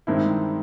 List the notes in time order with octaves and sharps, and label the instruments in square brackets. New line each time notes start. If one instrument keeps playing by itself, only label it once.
[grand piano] G2 D#3 G#3 C4 E4